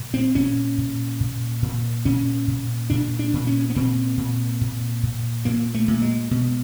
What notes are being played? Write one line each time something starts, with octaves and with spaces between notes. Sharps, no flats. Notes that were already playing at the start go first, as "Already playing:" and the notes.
Already playing: A#2
C4
A#2 C#4
A#2
A#2
A#2
A#2 C#4
A#2
A#2 D4
D4
A#2
C#4
B3
A#2 C4
A#2
A#2
A#2
A#2 A#3
A3
A#2
G#3
B2